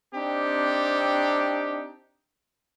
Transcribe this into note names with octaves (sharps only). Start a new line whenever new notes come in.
C4 D4 D#4 G4